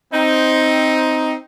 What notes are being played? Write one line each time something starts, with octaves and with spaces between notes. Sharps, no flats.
C4 D#4